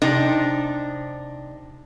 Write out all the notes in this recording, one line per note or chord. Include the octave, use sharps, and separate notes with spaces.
C3 D4 D#4